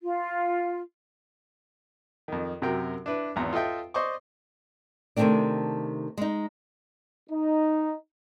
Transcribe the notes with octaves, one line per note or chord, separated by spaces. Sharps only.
F4
F2 D#3
F#2 C3 F#3 A#4 G5
D4 E4 B4
G#1 E2 A#5
F4 A4 D#5 E5 G5
C5 D5 D#5 C#6 D6
C3 D#3 E3 A3 C4 D4
G#3 D#4
D#4